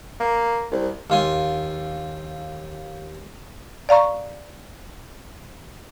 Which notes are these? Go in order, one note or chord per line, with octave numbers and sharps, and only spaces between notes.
A#3
C2
D#2 F4 G#5
D5 F5 A#5 C#6